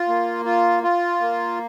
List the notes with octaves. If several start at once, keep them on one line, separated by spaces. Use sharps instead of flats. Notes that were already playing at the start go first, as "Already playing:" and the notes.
Already playing: F4
A#3
F4
F4
A#3